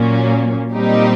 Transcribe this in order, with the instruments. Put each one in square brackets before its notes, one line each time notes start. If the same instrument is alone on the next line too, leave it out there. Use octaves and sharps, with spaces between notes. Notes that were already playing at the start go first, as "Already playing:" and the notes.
Already playing: [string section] A#2 F#3 A#3 C#4
A#2 G3 C4 D#4 G4